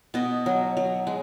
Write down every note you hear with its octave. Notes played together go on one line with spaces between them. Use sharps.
B2 D#5
F#3
F#3
G#3